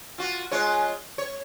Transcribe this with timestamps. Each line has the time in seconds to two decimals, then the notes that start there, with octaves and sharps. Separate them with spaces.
0.18 F4 F#4
0.52 G#3 F4 C#5
1.18 C#5